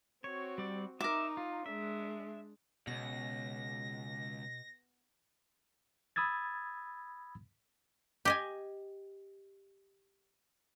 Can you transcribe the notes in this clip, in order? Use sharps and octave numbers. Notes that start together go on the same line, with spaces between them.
C4 F#4 C#5
G3 D5
D#4 A#4 E5 D6
F4
G#3 D4 E5
C#2 G2 B2 A#6
B5 D#6 E6 G#6 A6
G4 D#5 G#5